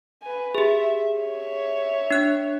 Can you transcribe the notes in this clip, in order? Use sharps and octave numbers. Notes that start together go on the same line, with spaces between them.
B4 G#5
G4 G#4 E5
C#5 E5
D4 F#6